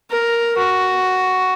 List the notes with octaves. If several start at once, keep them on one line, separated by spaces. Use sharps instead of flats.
A#4
F#4